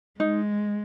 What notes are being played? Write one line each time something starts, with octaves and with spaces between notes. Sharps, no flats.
G#3 D#4